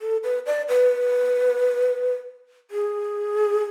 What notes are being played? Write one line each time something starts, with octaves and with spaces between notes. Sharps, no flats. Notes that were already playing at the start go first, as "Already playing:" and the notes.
A4
B4
D5
B4
G#4